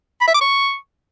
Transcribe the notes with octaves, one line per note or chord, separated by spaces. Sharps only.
B5
E5
D6
C#6